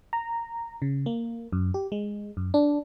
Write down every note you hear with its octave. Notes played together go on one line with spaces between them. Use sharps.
A#5
C#3
A#3
F#2
G4
G#3
F#2
D4